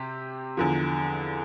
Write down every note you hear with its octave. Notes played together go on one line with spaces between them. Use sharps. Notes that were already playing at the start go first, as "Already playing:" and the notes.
Already playing: C3 C4 G4
E2 D3 F3